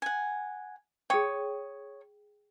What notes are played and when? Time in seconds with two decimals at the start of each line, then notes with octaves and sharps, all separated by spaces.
0.02 F#5 G#5
1.10 G#4 C#5 G5 D#6